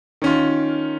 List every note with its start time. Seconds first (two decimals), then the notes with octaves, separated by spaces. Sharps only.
0.22 D#3 C#4 F4